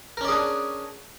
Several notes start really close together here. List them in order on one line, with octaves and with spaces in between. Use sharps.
A#4 C#4 D5 G#4 D4